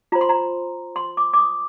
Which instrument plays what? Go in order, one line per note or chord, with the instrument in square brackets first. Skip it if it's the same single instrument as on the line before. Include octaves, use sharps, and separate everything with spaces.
[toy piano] F4 C5 A#5
C6
A#5
C6
D6
D6
D#6